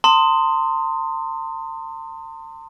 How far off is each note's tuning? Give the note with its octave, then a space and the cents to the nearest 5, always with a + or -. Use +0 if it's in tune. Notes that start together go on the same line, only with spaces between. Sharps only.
A5 +45 C6 +0 D#6 +5